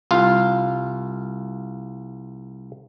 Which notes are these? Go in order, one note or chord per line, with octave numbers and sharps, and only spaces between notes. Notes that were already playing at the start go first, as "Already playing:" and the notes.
C2 F4 F5